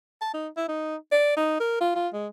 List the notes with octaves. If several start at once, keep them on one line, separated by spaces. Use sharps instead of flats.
A5
D#4
E4
D#4
D5
D#4
A#4
F4
F4
G#3